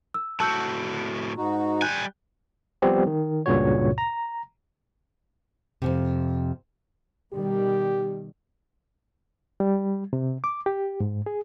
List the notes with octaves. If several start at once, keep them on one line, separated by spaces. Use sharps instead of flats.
E6
A2 F#4 A5 E6 G6
G#2 D#4 F#4
G3 G#5 F#6 G6
F3 G3 B3 C4 G4
D#3
C#2 G2 A#2 C#3 F#4 C#5
A#5
F2 A2 C3
B2 D#3 G3 G4
G3
C3
D6
G4
G#2
G#4